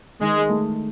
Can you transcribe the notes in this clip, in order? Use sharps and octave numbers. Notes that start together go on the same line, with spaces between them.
D#3 G#3
A3